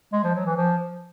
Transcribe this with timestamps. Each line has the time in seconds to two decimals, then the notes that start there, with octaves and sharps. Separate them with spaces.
0.13 G#3
0.24 F3
0.35 F#3
0.46 E3
0.57 F3